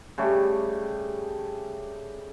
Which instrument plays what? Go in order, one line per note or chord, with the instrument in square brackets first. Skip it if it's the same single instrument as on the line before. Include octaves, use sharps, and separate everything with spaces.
[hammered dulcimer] C#3 G3 A3 G4